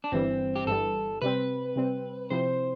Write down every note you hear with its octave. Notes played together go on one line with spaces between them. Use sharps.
D4
G1 G2 E3 G3 C4
G4
G1 G2 E3 G3 A4
C3 G3 C4 B4
C3 G3 C4
C3 F3 C4 E4 C5